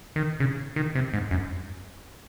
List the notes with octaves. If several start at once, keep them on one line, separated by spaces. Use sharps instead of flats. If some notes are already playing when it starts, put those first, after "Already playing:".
D#3
C#3
D#3
C3
G#2
F#2